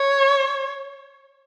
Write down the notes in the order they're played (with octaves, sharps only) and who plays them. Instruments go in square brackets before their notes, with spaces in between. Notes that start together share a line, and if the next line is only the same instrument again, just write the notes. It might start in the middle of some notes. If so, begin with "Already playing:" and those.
Already playing: [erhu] C#5